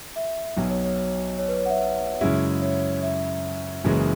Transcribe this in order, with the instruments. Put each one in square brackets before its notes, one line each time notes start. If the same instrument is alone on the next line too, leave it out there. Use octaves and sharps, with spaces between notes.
[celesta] E5
[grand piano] B1 B2 F#3
[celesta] C#5
C#5
C#5
B4
C#5
F#5
E5
[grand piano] F#2 C#3 G#3 C#4 E4
[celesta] C#5
E5
[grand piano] F#1 F#2 C#3 E3 G#3